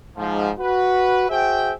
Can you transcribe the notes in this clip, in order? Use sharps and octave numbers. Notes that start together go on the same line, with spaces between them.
G#2 F3
F#4 B4
F#4 G#4 C5 E5 G5